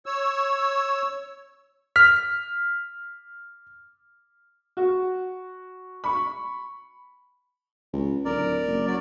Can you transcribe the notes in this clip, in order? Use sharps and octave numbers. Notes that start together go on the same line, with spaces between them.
C#5 E6
F6 B6
F#4
B5 C#6
C#2
D1 A#4 D5
F#1
F#3 D5